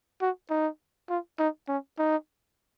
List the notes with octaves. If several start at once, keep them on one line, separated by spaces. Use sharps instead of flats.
F#4
D#4
F4
D#4
C#4
D#4